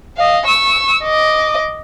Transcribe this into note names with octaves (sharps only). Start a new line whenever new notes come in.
D#5 F5
C#6 E6
D#5 D6